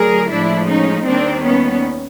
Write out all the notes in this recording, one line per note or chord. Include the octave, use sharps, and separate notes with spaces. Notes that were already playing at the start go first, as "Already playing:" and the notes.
Already playing: D2 D3 F#3 G#4 A#4
A2 F3 G#3 D4 E4
C#4 D#4
D#2 D#3 G3 C4 D4
B3 C#4